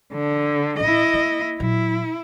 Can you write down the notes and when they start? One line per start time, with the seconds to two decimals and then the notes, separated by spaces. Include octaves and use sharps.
0.13 D3
0.80 A1 E4 D#5
1.14 A#3
1.60 A#2 F#3 E4